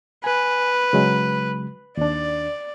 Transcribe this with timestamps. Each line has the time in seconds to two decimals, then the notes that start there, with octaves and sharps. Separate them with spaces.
0.24 B4 G#5
0.93 C#3 F#3 G#3
1.97 D#2 D4 D5